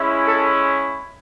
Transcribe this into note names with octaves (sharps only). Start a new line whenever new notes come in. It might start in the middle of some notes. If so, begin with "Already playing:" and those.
Already playing: G#3 C#4 E4
A4